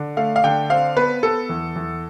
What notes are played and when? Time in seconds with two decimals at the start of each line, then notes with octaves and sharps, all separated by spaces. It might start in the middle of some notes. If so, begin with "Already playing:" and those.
Already playing: D3
0.17 A3 F5
0.36 F5
0.44 D3 G5
0.70 C4 F5
0.96 B3 B4
1.23 B3 A4
1.49 E2
1.76 E2